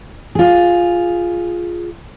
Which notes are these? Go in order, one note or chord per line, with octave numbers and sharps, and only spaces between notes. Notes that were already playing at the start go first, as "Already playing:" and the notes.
F4 G#4